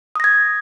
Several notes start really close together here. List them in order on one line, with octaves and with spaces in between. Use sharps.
D#6 A#6 G#6